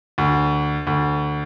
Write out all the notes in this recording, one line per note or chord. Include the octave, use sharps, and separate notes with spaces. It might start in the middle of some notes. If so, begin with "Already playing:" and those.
D2
D2